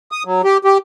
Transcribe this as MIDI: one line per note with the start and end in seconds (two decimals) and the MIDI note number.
0.12 0.23 87
0.25 0.42 54
0.44 0.58 67
0.65 0.78 67